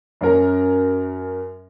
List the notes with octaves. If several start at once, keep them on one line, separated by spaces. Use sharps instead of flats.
F#2 C#4 A#4 A#5